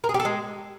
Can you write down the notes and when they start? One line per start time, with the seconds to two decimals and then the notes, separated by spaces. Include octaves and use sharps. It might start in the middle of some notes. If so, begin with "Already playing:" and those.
0.04 A#4
0.09 G#4
0.14 G4
0.20 A4
0.25 G#3